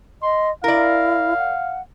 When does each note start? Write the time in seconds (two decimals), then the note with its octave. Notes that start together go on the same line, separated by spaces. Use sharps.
0.22 D#5 C6
0.64 E4 A#4 D5 F5
1.38 F#5